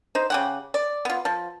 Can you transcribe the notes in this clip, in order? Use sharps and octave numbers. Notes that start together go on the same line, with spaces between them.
D#4 C5
C#3 G4 F#5
D5
B3 F4
F3